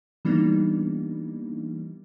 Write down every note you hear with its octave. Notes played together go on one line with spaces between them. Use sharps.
E3 G3 A#3 B3 D4 D#4